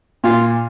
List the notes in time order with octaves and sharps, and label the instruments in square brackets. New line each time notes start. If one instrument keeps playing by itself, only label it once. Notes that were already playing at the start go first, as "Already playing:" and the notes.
[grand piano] A#2 [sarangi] F4